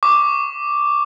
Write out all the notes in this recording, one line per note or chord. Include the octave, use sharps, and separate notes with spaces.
C#6 D6